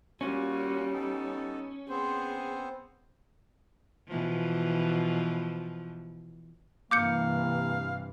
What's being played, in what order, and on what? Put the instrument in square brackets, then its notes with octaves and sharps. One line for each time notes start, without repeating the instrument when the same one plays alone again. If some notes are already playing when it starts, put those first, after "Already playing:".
[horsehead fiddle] G3 [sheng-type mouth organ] A#3 F4 F#4 [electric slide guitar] C#4
[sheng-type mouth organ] B3 D#4 A4
[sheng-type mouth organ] B3 C4 C5 [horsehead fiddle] G#4
[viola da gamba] B2 E3 F3
[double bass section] G2 C3 E3 [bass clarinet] A#3 [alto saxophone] F5 [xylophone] D6 G6 C#7